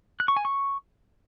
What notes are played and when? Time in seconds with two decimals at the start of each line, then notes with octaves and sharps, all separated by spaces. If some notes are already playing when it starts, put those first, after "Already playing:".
0.20 F#6
0.28 C#6
0.37 G#5
0.45 C#6